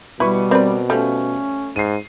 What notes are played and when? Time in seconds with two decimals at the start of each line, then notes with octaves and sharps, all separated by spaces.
0.20 B2 G3 E4 B4 C#6
0.51 C4 A#4 B4 D5
0.90 F3 G3 A3 C#4
1.76 G#2 C7 D#7